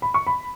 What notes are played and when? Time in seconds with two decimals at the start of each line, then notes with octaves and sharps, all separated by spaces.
0.02 B5
0.14 C#6
0.27 B5